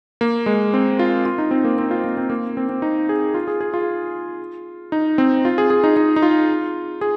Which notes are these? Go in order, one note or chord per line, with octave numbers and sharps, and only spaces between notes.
A#3
G#3
C4
F4
F4
D#4
C4
A#3
C4
F4
A#3
C4
A#3
C4
C4
D#4
G#4
F4
G#4
G#4
F4
D#4
C4
F4
G#4
G#4
D#4
D#4
D#4
F4
G#4